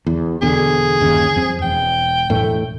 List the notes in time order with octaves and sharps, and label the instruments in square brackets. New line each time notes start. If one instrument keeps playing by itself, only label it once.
[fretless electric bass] E2
[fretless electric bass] E2 B2 D3 [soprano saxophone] G#4
[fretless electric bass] G1 D#2 C#3
F2 C4
[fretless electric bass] E1 [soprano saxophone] G5
[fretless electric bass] E1 A2 A3